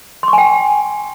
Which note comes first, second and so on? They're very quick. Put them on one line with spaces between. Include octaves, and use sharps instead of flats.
C6 C#6 G#5 G5